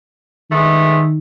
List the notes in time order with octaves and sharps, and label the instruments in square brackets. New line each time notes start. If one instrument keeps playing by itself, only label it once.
[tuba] D#3 [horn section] G#3 A3 B3